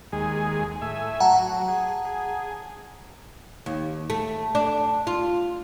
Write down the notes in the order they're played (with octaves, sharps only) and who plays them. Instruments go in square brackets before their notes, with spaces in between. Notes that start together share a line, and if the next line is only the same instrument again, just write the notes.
[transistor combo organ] D#2 G#3 G#4
A2 E5 G#5
[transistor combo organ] F#3 [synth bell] F#5 A5 A#5
[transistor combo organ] G#4
G#4
[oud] D#2
A3
D4
F4